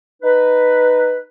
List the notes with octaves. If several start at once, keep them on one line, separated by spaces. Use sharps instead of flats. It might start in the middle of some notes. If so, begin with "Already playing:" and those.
D#4 B4